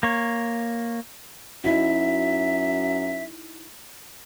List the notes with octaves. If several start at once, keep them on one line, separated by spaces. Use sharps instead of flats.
A#3 C#5
F#2 D#4 E4 F#4 E5